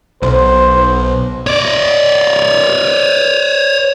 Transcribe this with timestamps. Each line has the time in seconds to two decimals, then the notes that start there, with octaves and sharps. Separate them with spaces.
0.22 B1 C5
1.47 C#5 D5